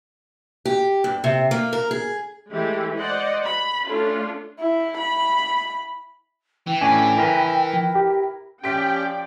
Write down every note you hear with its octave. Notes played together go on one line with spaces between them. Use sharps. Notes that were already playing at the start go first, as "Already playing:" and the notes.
G4
G2
C3
A#3
A#4
G#4
E3 G#3 A3 G4
C5 D5 D#5 F#5
B5
A3 C#4 D4 F4 A4
E4
B5
E3 G5
A2 C#4 D4 G#5
E4 A#4 B4
F3
G4
F3 C#4 G4 D5 G5 B6 D7